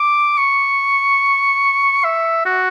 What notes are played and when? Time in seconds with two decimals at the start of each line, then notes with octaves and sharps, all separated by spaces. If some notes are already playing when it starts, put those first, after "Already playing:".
Already playing: D6
0.38 C#6
2.04 E5
2.46 F#4